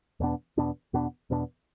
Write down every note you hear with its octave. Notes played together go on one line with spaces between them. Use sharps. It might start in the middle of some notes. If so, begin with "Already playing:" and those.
E2 B2 B3 D4
E2 B2 B3 D4
E2 B2 B3 D4
E2 B2 B3 D4